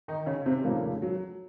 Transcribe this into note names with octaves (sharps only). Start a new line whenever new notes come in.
D#3 D#4
C#3 C#4
C3 C4
F1 F2 A#2 C#3 F3 A#3
F#3